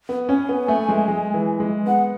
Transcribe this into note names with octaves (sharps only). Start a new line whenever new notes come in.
B3
C#4 G#5
B3
A3
G#3
G#3
E3
G#3
B3 F#5